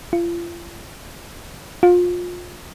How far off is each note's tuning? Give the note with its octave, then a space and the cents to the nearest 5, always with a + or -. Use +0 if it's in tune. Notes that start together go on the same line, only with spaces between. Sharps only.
F4 -35
F4 +25